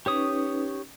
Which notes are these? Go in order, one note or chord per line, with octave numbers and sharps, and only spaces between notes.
C#4 D#4 G4 B4 C#5 D#6